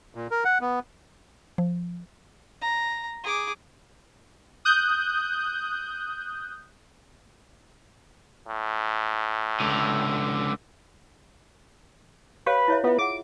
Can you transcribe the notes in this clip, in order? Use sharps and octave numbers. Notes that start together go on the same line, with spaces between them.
A#2
A#4
F#5
B3
F3
A#5
G#4 D6
D#6 F#6 G6
A2
C#2 D3
G4 B4 C#5 F5
E4 C#5 E5
B3 F4 E5
G#4 F#5 D6